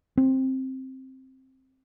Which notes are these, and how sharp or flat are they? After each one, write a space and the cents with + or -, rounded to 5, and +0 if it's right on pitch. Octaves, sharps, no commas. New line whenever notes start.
C4 +10